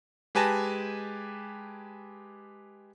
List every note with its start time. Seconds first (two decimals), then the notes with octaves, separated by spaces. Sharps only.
0.35 G#3 G4 B4 G#5 A5 A#6